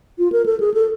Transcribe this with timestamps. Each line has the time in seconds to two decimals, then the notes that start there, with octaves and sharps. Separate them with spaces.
0.19 F4
0.32 A#4
0.46 A4
0.60 G#4
0.74 A4